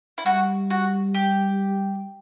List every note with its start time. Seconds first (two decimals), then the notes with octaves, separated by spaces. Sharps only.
0.18 E4
0.26 G3 F#4
0.70 F#4
1.14 G4